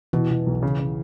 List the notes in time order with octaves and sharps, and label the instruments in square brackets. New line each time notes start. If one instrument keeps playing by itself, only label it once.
[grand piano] B2 [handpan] E3
[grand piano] B2
B1
C#3
C#3